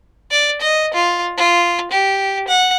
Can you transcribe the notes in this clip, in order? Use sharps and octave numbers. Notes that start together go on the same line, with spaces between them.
D5
D#5
F4
F4
G4
F#5